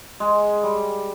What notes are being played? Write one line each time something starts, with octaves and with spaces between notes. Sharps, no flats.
G#3
G3